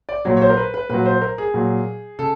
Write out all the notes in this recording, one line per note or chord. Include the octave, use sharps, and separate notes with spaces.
D5
A#2 F#3 C#5
C#5
C5
A#4
B4
B4
A#2 F#3 B4
C5
A#4
G#4
A#2 F#3
C#3 A4